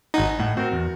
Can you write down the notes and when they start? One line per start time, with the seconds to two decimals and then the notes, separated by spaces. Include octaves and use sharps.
0.14 G#1 D#4 D#5 F#5 G#5
0.40 A2 F#5
0.57 C4 F#4 A#4
0.72 E2